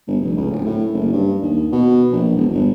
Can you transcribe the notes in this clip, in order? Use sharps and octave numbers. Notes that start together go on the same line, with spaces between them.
G1
F1
C#2
D1
A2
F#1
G2
D#2
B2
A#1
E1
G1